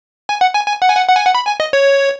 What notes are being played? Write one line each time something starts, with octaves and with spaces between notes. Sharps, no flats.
G#5
F#5
G#5
G#5
F#5
G#5
F#5
F#5
G#5
F#5
B5
G#5
D#5
C#5